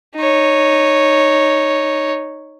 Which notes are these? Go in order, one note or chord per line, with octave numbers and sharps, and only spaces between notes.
D#4 C#5